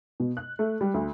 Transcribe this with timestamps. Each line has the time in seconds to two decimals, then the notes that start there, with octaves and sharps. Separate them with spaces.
0.20 B2
0.37 F#6
0.59 A3
0.81 G3
0.94 D2